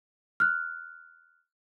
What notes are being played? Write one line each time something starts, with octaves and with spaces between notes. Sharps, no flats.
F6 F#6